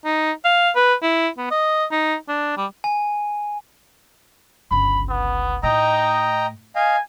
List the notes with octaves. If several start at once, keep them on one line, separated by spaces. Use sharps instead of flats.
D#4
F5
B4
E4
B3
D#5
D#4
D4
G3
G#5
G1 C#2 B5
B3
A2 D#4 D#5 G5 A#5
D#5 F5 G#5